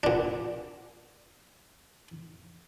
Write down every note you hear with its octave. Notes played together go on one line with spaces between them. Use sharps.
A#2 D4